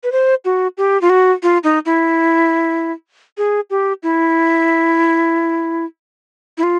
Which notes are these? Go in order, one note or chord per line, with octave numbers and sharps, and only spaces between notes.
B4
C5
F#4
G4
F4
F#4
F4
D#4
E4
G#4
G4
E4
E4
F4